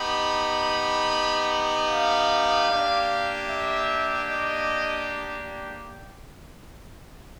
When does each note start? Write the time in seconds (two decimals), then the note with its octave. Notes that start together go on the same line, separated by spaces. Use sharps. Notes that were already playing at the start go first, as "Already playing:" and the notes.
Already playing: B3 D#4 G4 B5
1.90 F5
2.69 A#3 D4 G4
3.49 E5
4.28 D#5